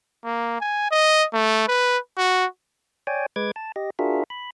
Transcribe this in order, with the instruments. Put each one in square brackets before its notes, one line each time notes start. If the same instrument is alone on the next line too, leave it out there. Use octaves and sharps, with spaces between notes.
[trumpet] A#3
G#5
D#5
A3
B4
F#4
[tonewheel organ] C#5 D5 G5 G#5
G#3 B4 D6 G#6
A5
G4 D#5
D4 F4 F#4 G#4 A#4 E5
B5